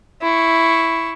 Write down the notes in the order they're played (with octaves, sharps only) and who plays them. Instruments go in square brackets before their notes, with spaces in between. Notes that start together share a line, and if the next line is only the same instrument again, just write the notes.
[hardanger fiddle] E4 C#6